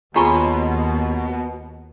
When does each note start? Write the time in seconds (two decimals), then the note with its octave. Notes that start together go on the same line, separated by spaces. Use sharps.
0.16 D#2 B2 F4 G#4 C#5 G#5 A#5 C6